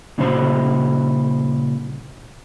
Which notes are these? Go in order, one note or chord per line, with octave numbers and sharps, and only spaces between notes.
A#2 C#3 G3 E4 F#4 C5